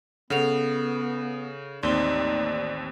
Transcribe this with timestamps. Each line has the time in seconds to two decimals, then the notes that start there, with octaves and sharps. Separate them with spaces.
0.30 C#3 B3 A4 F#5 F7
1.83 A1 D#2 C4 D#4 D5 C6